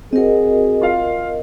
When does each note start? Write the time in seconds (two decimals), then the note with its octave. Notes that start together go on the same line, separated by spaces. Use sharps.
0.13 C4 F#4 G#4 A#4 D#5
0.81 F4 F5